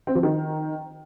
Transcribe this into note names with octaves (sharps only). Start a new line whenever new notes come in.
C4
F3
D#3